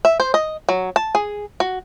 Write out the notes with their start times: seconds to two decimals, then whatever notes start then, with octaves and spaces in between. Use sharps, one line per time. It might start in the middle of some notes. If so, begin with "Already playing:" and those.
0.05 E5
0.20 C5
0.34 D#5
0.69 F#3
0.96 A5
1.15 G#4
1.60 F#4